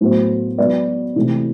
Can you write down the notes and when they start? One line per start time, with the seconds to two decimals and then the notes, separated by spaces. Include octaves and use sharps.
0.01 A2 F#3 B3 F#4 C5
0.58 F#3 B3 F#4 B4 D5
1.16 C3 E3 A3